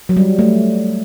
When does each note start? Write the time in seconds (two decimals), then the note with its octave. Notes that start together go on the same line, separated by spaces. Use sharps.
0.09 F#3
0.17 G3
0.39 A3